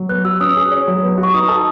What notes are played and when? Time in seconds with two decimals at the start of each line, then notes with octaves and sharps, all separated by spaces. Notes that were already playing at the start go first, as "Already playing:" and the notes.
Already playing: F#3
0.09 B3 F#6
0.25 F#4 E6
0.41 C#4 D#6
0.57 G#4
0.71 C#5
0.88 F#3
1.03 B3
1.18 F#4
1.23 C#6
1.34 D#4 D#6
1.49 A4